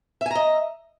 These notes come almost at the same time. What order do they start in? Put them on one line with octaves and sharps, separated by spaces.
E5 G#5 A#5 D#5